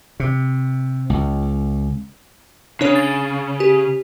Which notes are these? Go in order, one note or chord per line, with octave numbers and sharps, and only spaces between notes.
C3
C#2
C#3 D4 C#5
A6
G4